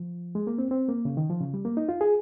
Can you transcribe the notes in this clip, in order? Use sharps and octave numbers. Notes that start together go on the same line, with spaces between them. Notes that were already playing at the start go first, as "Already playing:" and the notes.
Already playing: F3
G#3
A#3
C4
C4
A#3
C#3
D#3
F3
C#3
G3
A#3
D#4
F4
G#4